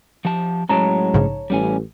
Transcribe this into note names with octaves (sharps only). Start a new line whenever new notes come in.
F3 G4 A5
A2 F#3 G#3 C#4 C#5 A5 A#5
A#1 G#2 C#3
A1 G3 C#4 G#5